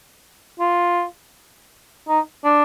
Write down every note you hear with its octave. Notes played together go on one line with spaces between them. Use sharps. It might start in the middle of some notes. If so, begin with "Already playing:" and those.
F4
D#4
D4